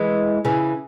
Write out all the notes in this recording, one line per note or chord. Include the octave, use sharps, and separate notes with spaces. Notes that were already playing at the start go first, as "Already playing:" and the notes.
Already playing: E3 G#3
C#3 E3